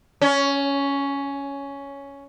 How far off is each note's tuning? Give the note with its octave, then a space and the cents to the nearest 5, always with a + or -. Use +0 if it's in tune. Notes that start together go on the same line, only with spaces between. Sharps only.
C#4 +10